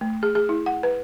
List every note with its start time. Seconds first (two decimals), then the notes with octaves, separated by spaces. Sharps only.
0.01 A3
0.23 G#4
0.35 G#4
0.49 E4
0.66 F#5
0.83 B4